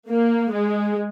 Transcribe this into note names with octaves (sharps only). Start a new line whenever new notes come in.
A#3
G#3